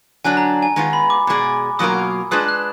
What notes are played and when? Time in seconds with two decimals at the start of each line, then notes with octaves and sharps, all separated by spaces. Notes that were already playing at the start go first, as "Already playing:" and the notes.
0.24 D3 F#3 D4 G#5
0.37 A#5
0.62 G#5
0.76 D#3 G#3 B3 F4
0.93 B5
1.10 D6
1.27 B2 G#3 D4 G#4 D5
1.79 B2 F#3 A#3 F4 A#4 D#6
2.31 G#3 D4 F4 G#4 B4 D#6
2.49 F#6